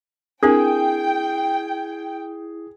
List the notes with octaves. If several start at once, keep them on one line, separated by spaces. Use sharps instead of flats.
C4 D4 E4 G#4 A#4 G5